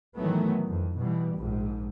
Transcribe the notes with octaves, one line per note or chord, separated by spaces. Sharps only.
A2 D#3 E3 F#3 A3 B3
F2
B2 E3 G3
A#1 G#2